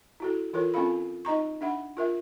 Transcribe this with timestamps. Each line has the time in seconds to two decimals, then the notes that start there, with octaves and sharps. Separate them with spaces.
0.20 E4 F#4 A4
0.53 E3 F4 A4 A#4 C#5
0.74 C4 C#4 F4 A4 F5 B5
1.25 D#4 D#5 A#5 C#6
1.61 D4 E5 F#5 B5
1.97 F4 A#4 E5